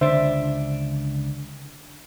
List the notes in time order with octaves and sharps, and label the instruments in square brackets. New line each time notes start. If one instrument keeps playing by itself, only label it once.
[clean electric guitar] C#2 D4 [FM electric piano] D3 [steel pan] C5 E5